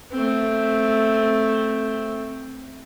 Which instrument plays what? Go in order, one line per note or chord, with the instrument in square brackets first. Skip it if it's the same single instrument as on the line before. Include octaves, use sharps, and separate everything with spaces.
[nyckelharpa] A3 C4